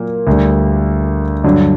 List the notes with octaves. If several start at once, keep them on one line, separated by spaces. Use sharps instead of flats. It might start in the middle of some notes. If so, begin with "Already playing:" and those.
Already playing: A#2 F#3 A#3
D2 D3 G3
G2 D3 F#3